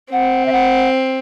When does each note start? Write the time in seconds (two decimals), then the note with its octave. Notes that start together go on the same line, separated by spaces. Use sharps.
0.12 C4 F#5
0.46 E5
0.52 F#5